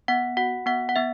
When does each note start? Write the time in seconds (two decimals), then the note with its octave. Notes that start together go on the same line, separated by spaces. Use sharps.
0.08 B3 F#5
0.37 F#4 F#5
0.66 B3 F#5
0.89 F#5
0.96 B3 E5